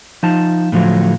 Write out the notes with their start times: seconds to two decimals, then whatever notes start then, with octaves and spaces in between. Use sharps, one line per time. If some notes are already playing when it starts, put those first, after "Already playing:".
0.23 F3 D#4 A5
0.72 A2 D3 F3 F#3